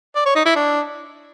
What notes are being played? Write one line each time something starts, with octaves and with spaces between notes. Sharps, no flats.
D5
C#5
D#4
E4
D4